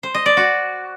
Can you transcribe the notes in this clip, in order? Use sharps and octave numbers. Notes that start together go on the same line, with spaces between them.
C5
D#5
D5
F#4